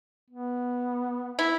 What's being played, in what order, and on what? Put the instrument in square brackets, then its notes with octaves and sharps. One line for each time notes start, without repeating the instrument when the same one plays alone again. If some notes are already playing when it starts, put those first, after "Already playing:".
[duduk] B3
[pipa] E4